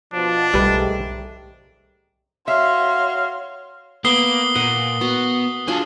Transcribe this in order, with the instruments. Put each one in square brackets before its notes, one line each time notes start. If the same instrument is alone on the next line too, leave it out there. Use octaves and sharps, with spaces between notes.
[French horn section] B2 F3 [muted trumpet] D4
[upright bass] B1 [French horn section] G#2 A3 G4 [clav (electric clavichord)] G3 B4
[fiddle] F#4 C#5 [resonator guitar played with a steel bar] E5 [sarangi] F5 [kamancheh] C6
[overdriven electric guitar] A#3 [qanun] B3 B4 [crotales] D#6 C7 G7
[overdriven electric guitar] A#2 [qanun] A#4 F#5
[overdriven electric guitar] B3 [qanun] F#4
[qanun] F#3 D4 F4 [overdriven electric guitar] G#4 A4